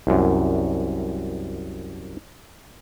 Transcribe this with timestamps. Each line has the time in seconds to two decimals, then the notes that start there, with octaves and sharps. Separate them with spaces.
0.07 C2 F#2